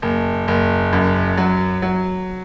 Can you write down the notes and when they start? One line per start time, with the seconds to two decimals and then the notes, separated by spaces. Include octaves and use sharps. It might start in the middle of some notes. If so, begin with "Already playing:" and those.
0.02 F#1
0.48 F#1
0.93 F#2
1.37 F#3
1.82 F#3